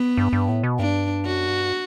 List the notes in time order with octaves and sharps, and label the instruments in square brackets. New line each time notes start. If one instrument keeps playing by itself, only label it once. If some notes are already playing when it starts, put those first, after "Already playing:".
Already playing: [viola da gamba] B3
[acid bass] G2
G2
A2
B2
[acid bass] G2 [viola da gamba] D4
[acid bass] F#2 [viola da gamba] F#4
[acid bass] G2